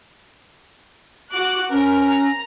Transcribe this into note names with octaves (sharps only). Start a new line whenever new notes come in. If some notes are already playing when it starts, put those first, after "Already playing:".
F#4 D6 F#6
C#4 A#4
A#5